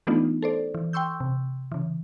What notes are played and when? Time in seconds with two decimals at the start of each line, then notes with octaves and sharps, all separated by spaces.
0.07 E3 A3 B3 D4 D#4 F4
0.42 A4 C5 D5
0.74 E3
0.93 G5 C6 C#6 E6 G6
1.20 C3
1.72 C#3 E3